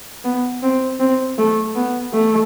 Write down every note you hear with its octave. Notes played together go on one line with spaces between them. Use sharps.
B3
C4
C4
A3
B3
A3